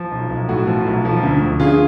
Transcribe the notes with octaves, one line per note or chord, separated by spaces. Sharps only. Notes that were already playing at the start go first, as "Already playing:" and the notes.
Already playing: F3
B1
B1
A2 F#4
F3
B1
F3
D2
D2
D3 F4 G#4